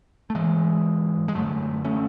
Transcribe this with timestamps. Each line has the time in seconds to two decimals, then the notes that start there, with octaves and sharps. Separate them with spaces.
0.30 A3
0.34 G#2 E3 G#3
1.28 G#3
1.35 F#2 D3 F#3 A3
1.85 A3 C#4